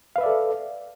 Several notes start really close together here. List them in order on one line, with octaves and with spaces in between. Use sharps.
F5 B4 E5 D5 A4